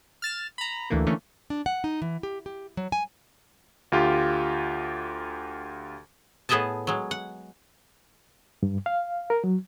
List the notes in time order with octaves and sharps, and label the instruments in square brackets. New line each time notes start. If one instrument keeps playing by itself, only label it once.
[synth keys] F6 A6 E7
A#5 B5
D2 D3 E3 A3 A#3
D3 E3 A3 A#3 C#4
[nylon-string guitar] D4
F#5
D#4
E3
G4
G4
F#3
G#5
[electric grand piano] D2 F4 G4
[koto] A2 B3 G#4 D#5 E5 A5
F#3 G#3
F#5
[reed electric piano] G2
F5
A#4
F#3